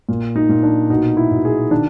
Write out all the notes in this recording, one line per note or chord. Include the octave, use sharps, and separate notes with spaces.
A#2
D#4
A#2
D4
B2 D#4
E4
B2
G#4
D#3 D4